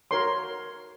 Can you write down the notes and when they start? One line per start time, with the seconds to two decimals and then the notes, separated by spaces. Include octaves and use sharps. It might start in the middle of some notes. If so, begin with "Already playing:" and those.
0.11 F#4 A#4 C#5 C6